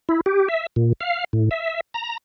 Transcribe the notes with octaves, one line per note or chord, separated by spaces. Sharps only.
E4
G4
E5
A#2
F5
A2
E5
A#5